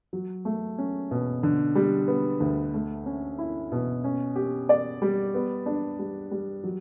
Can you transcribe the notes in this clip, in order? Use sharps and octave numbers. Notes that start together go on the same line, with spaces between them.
F#3
A3
C#4
B2
D3
G3
B3
D2
A3
C#4
E4
B2
C#4
G4
D5
G3
B3
D4
G3
G3
F#3